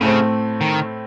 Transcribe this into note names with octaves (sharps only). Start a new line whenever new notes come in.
A2 C#3 A3 C4
D#3